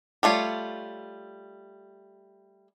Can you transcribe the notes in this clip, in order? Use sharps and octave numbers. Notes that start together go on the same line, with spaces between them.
G3 A3 F4 C#5